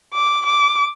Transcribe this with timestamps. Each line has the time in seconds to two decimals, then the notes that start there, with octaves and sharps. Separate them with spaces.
0.13 D6
0.46 D6